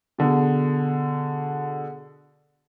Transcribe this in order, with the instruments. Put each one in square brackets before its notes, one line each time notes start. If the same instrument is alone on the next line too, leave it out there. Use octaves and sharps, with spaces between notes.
[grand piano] B2 D3 G#4